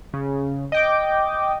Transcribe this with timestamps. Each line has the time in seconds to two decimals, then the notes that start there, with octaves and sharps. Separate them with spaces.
0.13 C#3
0.72 D#5 G5 D6